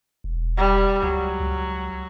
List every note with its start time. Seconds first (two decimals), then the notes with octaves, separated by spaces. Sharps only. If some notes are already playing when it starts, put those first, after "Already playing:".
0.24 E1
0.57 G3
1.03 C#2 F#3
1.40 C#2